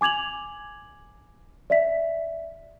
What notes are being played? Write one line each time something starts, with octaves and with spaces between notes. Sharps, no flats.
G#5 D6 G#6 F7 F#7
D5 E5 B6